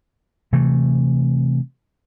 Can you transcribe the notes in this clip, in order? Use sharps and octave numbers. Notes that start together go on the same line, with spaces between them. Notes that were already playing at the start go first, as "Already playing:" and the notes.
C3 E3 A3